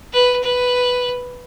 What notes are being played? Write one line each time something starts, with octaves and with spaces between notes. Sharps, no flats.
B4
B4